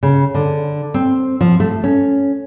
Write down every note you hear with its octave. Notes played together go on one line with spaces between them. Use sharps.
C#3
D3
C4
F3
A3
C#4